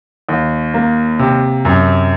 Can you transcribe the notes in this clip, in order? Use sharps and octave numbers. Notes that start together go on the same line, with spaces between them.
D#2
A#3
C3
F#2